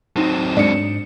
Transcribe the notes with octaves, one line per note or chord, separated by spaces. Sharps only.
F#3 C4 D#4 E7
G#2 D4 C#7